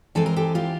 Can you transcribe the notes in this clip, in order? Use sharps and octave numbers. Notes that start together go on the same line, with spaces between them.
E3 G#3 C4 A4
A#4
G4 A4
F4 G4